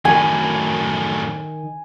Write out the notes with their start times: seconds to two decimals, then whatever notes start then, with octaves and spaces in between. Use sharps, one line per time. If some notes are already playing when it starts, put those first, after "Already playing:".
0.05 F#2 A2 D#3 G#5